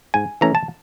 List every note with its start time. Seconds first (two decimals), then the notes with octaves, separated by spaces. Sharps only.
0.14 G#2 G#5
0.41 E3 A3 C#4 A#5
0.55 A5